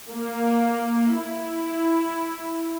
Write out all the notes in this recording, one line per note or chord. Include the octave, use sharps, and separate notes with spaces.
A#3
E4